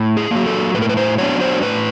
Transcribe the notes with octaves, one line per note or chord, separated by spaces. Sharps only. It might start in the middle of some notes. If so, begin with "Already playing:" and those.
Already playing: A2
G#4
F#3 A#3
A4
A2 B4
A#4
B4
C5
F#3 B3 D4 C#5
C5
A2 B4